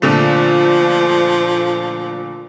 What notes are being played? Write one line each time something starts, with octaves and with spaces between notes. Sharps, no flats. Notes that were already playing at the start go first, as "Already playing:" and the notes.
A#2 D3 F3 A3